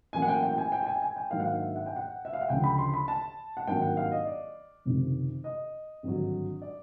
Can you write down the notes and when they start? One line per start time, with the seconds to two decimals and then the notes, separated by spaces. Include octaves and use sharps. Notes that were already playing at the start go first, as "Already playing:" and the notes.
0.13 A1 A2 F#3 A#3 G#5
0.22 F#5
0.28 G5
0.43 G5
0.53 G5
0.58 G#5
0.72 G5
0.83 G5
0.87 G#5
1.02 G#5
1.16 G5
1.31 G#2 D#3 F#3 A#3 D4 F5
1.40 F#5
1.46 F5
1.60 E5
1.76 F#5
1.86 G5
1.96 F#5
2.25 E5
2.33 F5
2.41 F#5
2.49 D2 C#3 F3 G5
2.64 B5
2.78 C6
2.94 B5
3.08 A5
3.57 F#5
3.67 G#1 G2 D#3 F#3 A#3 G5
3.82 F#5
3.97 F5
4.12 D#5
4.26 D5
4.85 F#1 F2 C3 D#3
5.44 D#5
6.03 G#1 G2 D3 F#3
6.62 D5